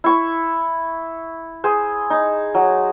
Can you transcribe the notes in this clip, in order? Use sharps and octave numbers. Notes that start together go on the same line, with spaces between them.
E4 C#6
G#4 C5
D#4
F#3